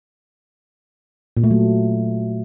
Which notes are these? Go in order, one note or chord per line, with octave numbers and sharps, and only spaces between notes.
A#2
A3
F#3